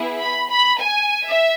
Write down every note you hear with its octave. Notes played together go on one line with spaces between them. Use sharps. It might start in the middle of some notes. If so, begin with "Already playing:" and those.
Already playing: B3 E4 G#4
B5
B5
G#5
E5